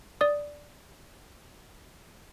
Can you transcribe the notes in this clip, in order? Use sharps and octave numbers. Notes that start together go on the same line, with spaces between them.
D5 D#6